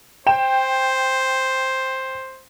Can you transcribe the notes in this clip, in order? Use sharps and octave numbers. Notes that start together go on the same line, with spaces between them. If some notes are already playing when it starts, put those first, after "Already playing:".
C5 G5 E7